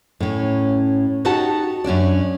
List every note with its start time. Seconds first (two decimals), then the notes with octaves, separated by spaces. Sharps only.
0.20 A2 C#4
1.25 D#4 F#4 G4 A4 F#5 A5
1.84 F#2 C#4 D4 D5